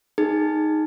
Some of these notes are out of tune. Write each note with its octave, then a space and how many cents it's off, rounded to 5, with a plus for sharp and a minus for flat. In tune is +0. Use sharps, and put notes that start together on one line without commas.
D#4 +0 G#4 +0